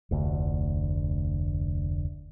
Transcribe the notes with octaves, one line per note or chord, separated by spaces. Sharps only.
F1 D2